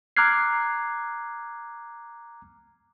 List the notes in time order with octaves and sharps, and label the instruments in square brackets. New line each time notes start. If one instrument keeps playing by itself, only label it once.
[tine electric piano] A#5 D6 F6 F#6 G#6 C7